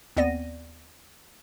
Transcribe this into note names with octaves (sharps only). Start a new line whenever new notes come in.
D#2 B3 C4 D5 A#6 D#7